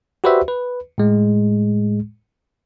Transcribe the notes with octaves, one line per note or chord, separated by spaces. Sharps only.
F#4 G4 B4 C5 D5 E5
B4
A2 G#3